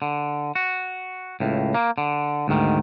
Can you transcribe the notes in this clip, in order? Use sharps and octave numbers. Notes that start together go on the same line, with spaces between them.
D3
F#4
C#2 A2
A#3
D3
D2 G#2 D#3